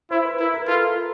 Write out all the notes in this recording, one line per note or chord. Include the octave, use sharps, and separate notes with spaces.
E4 C5
B4
E4 A#4
A#4
F4 A4